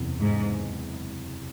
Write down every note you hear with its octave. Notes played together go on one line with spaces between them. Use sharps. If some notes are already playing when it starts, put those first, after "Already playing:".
Already playing: F#1 E2 C3
G#2